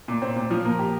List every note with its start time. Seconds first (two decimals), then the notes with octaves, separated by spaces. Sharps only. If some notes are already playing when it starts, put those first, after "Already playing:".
0.08 A#2
0.22 C4
0.36 A#2
0.51 F3
0.65 A#3
0.79 G4